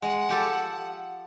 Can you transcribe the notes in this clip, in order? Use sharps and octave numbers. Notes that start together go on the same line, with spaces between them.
G#3 F#5
F3 G4 A4